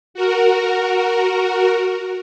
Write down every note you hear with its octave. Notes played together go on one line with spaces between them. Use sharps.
F#4 A#4